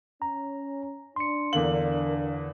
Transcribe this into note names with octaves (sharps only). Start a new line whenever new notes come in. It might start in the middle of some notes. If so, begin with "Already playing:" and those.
C#4 A#5
D4 C6 C#7
E2 D3 A#4 F5 F#7